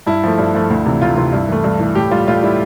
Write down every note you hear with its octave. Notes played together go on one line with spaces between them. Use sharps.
G2 E4
F3 A3
G2 E4
F3 A3
D2
C3 E3
D2 F4
C3 E3 F4
G2 E4
E3 A3
G2
E3 A3
A2 G4
G3 F4
A2 F4
G3 E4